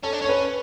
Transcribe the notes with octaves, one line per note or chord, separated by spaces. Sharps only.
C#4 A4
D4
C#4 C#5
B4